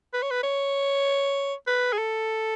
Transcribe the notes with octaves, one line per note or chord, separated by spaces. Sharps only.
B4
C#5
B4
C#5
B4
G#4
A4